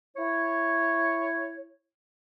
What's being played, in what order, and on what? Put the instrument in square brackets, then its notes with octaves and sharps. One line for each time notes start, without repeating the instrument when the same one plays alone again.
[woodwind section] E4 C#5